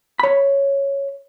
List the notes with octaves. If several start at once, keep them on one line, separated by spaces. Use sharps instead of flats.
C#5 B5